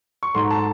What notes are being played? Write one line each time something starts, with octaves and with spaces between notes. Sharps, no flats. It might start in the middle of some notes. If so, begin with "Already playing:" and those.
C#6
G#2 F#3 A3 C6
A5